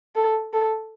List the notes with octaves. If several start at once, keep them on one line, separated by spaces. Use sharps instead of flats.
A4
A4